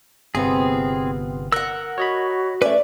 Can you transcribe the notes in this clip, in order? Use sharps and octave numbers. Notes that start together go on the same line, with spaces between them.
G1 C3 B3 C4 F4 G#4
A#4 F#5 E6 F#6
F#4 C#5 D#5 B5
A3 C#4 B4 D5 E5